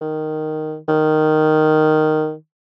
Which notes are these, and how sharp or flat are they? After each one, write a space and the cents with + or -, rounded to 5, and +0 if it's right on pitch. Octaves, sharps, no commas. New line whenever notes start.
D#3 -5
D#3 -5